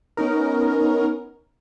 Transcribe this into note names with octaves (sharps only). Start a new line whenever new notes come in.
B3 C#4 D#4 A#4